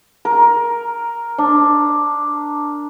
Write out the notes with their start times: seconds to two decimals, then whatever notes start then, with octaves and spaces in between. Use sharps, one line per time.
0.25 A#4
1.38 D4